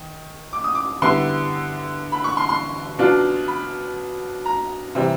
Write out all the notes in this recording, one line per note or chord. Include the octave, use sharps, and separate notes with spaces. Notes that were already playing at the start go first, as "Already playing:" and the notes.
Already playing: D#3
D6
D#6
D6
D3 G3 B3 E4 C6
B5
C#6
C6
C6
B2 F#3 B3 D4 F4
B5
A#5
C3 E3 G3 C4